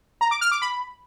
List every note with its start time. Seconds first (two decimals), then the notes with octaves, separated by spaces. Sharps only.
0.21 A#5
0.31 D6
0.41 F6
0.51 D6
0.62 B5